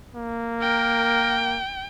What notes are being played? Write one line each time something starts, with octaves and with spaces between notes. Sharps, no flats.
A#3
A#4 G5